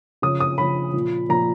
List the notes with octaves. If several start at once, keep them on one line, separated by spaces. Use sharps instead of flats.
C#3 F3 D#6
D#6
C#3 F3 B5
A#2 F3
A#2 F3 A#5